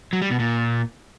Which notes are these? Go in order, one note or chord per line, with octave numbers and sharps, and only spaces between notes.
F#3
G3
B2
A#2